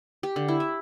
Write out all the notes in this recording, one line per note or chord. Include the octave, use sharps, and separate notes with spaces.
G4
D3
E4
E5